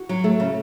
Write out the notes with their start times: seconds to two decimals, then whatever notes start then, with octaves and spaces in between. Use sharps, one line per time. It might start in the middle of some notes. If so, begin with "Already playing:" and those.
Already playing: F#4
0.09 F#3
0.24 A3
0.40 C#3